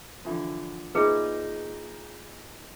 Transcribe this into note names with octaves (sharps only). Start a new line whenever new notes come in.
D3 E3 F3
A#2 D#4 E4 G#4 B4